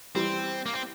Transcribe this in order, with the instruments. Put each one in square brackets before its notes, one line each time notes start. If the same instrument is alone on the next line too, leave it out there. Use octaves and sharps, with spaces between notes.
[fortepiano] E3 G3 [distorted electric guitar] C4
[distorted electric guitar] A#3
C4